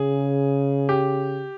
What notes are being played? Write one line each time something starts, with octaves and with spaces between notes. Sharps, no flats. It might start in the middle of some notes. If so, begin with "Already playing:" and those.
Already playing: C#3 G#4
G4